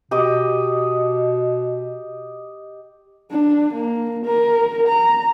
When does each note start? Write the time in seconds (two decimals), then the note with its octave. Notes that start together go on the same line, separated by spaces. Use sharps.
0.11 B2 G4 D#5
3.31 D4
3.73 A#3
4.25 A#4
4.88 A#5